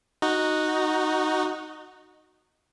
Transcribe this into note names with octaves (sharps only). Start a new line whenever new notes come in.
D#4 F#4